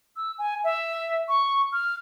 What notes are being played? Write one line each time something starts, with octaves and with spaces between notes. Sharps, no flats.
E6
G#5
E5
C#6
F6